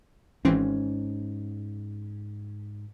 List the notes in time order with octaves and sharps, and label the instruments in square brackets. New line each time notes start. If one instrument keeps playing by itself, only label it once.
[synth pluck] G#1 E3 C4 [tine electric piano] G#2 [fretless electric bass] C#4